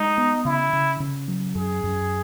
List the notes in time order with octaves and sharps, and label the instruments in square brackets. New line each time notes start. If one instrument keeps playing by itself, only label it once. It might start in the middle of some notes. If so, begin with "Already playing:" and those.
Already playing: [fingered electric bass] G#3 [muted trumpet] D#4
[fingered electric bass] B3
[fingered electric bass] C#3 [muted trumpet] E4
[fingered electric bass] C#3
C#3
F#3
[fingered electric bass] F#2 [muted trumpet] G#4
[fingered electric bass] F#2